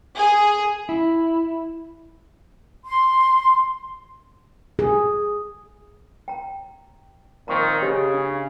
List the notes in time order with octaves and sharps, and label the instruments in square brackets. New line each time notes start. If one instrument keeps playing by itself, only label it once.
[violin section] G#4
[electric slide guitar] E4
[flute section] C6
[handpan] G#4
[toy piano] G5 A#5
[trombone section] A#2 D#3 C4 [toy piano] A#5 C#6
[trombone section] C#3 [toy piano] G4 C5 D#5
[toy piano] D4